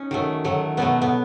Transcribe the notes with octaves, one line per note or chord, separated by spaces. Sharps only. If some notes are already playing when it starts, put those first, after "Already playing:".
Already playing: C#4 D#4
D#3 F#3 A3
D#3 F#3 A3
B2 F#3 A3 B3
B3